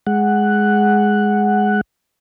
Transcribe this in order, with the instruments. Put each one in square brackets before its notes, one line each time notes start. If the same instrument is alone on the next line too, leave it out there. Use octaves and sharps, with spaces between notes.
[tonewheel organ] G#3 F#5